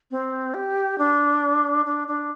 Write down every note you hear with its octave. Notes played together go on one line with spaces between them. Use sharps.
C4
G4
D4
D4
D4